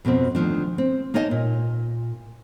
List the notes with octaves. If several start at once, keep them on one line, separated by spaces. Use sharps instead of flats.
F2 B2 F3 C4
D2 D#3 F3 D4
C4
A#3 D#4 C#5 D#5 G5 A5
A#2